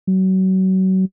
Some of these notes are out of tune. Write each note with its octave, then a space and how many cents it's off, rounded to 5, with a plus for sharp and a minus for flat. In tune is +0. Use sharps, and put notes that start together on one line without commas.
F#3 +30